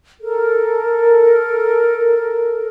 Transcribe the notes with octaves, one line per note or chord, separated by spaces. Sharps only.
A4 A#4